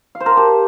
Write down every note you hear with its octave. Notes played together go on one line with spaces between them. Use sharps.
F5
C5
A#4
A5
G4